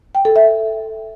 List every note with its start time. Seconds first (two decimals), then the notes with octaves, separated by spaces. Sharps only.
0.15 G5
0.25 A4
0.36 E5